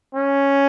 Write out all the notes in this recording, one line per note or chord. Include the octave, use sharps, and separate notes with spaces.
C#4